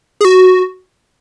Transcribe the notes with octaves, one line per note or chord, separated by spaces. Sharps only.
G#4
F#4